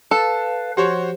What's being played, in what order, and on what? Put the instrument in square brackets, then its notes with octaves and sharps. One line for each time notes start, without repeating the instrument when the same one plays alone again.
[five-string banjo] A4 [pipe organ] B4 F5 [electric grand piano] A5
[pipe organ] F3 [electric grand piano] F#4 C5 C#5 [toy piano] G4